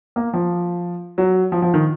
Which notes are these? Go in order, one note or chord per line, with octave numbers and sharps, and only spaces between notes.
A#3
F3
F#3
F3
F3
D#3